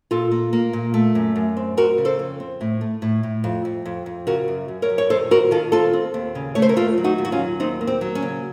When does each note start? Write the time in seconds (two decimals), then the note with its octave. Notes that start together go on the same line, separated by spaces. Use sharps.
0.11 A#2 F4 A4
0.31 A#3
0.53 A#3
0.73 A#2
0.94 A3
1.15 F#2
1.36 F#2
1.57 C4
1.77 C4 F#4 A#4
1.98 C#3
2.05 A4 C5
2.19 F2
2.40 C4
2.61 A2
2.81 A3
3.02 A2
3.23 A2
3.44 F2
3.65 F2
3.85 F2
4.06 F2
4.27 C#3 F#4 A#4
4.48 F#2
4.68 F#2
4.82 A#4 C#5
4.90 F#2
4.98 C#5
5.10 D#3 A4 C5
5.31 C4 F#4 A#4
5.51 D#3 F4 A4
5.72 C4 F4 A4
5.93 C4
6.14 D#2
6.35 C#3
6.55 A3 C#5
6.62 C5
6.69 A#4
6.76 D#2 F4 A4
6.98 F#3
7.04 D#4 F#4
7.18 D#2
7.25 F#4
7.32 C#4 F4
7.39 F#3
7.60 D#2 C4 D#4
7.81 A#3
7.87 C4
8.01 F#3
8.15 C#4
8.22 C#3